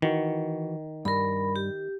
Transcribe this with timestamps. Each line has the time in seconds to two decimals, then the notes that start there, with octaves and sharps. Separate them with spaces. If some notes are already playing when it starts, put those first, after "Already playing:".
0.02 D#3 E3 F#4
1.05 G2 A#4 B5
1.56 G4